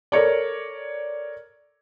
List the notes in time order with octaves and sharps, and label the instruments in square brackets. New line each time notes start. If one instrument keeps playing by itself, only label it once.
[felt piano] A4 A#4 C#5 D5